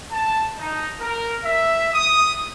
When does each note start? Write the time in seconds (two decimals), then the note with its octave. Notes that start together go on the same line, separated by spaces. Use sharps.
0.12 A5
0.58 D#4
1.00 A#4
1.44 E5
1.94 D#6